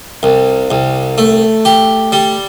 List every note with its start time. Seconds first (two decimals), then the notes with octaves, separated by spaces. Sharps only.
0.23 C2
0.71 C2
1.18 A3
1.65 G4
2.12 G3